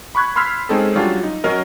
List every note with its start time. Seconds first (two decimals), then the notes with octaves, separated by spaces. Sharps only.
0.15 B5 C#6 F#6 G#6
0.36 B5 C6 E6 F6 G#6 B6
0.69 G#3 C4 C#4 D#4 G#4 A4
0.95 F#3 G3 C#4 D4 F4
1.23 D#4
1.44 F#3 C#4 A#4 D#5